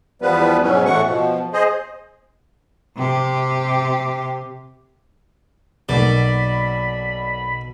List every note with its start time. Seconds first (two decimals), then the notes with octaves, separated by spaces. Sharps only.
0.22 E2 F3 G3 B3 B4
0.63 G#2 B2 F#3 C#4
0.86 E2 A2 E3 A3 F#5 C#6
1.06 B2 F3
1.53 G#4 C5 D#5
2.97 C3 G4
5.89 B1 B2 A#3 D5 B5